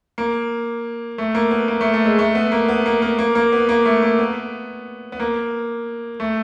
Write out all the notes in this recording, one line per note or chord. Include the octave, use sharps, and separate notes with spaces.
A#3
A3
A#3
B3
A#3
A3
A3
G#3
A3
B3
A#3
B3
A#3
A#3
A#3
A#3
B3
A#3
A3
A#3
B3
B3
A#3
A3